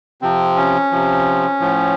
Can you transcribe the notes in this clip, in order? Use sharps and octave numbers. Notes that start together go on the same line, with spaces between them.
C3 F3 C4
C#4
C3 F3
A2 F3